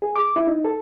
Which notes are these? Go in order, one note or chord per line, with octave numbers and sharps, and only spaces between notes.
G#4
D6
E4
D#4
A4